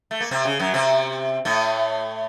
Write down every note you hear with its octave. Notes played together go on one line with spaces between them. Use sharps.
A3
A#3
C3 C4
C#3
F#2 F#3
C3 C4
A2 A3